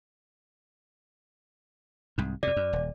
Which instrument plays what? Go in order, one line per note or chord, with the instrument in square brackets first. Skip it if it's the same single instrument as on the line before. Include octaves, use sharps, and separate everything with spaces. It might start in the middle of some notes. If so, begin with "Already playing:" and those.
[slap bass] C2 G#2
[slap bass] F2 C3 [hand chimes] D5
[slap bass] F#2
D#1